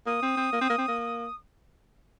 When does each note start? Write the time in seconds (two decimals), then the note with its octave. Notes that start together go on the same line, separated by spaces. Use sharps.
0.06 A#3 D#6
0.22 C4
0.37 C4
0.52 A#3
0.61 C4
0.70 A#3
0.78 C4
0.88 A#3